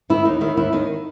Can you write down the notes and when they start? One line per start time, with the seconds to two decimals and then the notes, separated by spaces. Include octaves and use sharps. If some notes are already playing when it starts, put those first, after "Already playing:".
0.10 D#3 E4
0.25 D#2 D#4
0.41 D#3 E4
0.57 D#2 E4
0.73 D#3 D#4